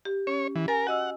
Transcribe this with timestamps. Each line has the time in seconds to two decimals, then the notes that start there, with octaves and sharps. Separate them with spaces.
0.05 G4
0.27 C#4 C#5
0.56 E3
0.68 A#4 G#5 A6
0.87 F#4 D#5 F#5 E6